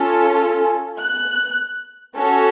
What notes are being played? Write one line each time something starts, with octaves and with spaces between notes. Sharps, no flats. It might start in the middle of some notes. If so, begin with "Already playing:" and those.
Already playing: C#4 F4 A4
F#6
C#4 F#4 A4